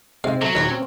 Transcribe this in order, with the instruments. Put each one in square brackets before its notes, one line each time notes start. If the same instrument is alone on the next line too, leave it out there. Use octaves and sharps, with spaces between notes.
[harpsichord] G#2 F5 [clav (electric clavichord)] C3 G#3 C4
[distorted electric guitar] F#3 [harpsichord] A3
[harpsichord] A#1 B4 C#5 [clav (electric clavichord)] D#2 G4
[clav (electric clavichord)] C4 C#4